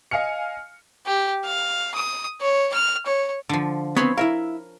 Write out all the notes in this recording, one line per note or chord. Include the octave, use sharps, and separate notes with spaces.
D#5 F5 G#5 F6 C#7
G4
F5
D#6
C#5
F6
C#5
D3 F3
B3 C4 C#5 B5 C6
E4 A#4 E5 F5